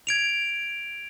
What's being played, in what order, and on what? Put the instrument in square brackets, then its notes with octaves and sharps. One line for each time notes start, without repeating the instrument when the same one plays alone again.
[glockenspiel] G#6 D7 F7